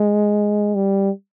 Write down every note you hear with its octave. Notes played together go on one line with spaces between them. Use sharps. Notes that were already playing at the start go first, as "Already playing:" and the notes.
Already playing: G#3
G3